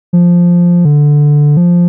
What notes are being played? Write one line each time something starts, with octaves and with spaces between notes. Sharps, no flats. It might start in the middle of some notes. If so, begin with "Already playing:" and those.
F3
D3
F3